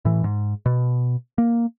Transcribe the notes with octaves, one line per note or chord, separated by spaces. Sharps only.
A2 E3
G#2
B2
A#3